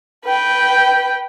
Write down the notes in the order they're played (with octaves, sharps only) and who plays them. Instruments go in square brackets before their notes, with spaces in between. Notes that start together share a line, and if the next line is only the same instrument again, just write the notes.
[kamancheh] B4 G5